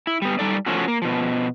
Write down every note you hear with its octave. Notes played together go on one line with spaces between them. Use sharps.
E4
G3 B3
G3 D#4 A4 D5
F3 A3 C#4 F#4
A#3
B2 F3